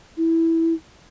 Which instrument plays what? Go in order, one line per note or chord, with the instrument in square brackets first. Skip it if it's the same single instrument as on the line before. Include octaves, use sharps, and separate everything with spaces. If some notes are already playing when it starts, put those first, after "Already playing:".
[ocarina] E4